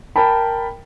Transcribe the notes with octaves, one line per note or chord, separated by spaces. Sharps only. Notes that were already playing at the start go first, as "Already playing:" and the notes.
A#4 G5 A5 B5